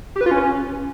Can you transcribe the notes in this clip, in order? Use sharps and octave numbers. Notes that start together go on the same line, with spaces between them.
G4
B4
F4
C#4